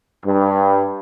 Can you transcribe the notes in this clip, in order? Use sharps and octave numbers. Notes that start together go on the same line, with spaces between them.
G2